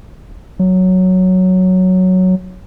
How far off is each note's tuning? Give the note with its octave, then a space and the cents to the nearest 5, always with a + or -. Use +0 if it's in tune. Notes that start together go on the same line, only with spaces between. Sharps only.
F#3 +0